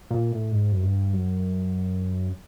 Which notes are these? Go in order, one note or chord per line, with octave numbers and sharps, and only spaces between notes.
A#2
A2
G#2
F#2
G2
F#2